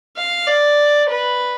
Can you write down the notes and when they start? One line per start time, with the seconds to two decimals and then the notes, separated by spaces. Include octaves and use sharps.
0.17 F5
0.47 D5
1.10 B4